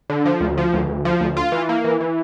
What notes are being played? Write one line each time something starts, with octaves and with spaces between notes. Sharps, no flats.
D3
F3
D2
F3
D2
D2
F3
D2
F4
E3
A#3
E3
E3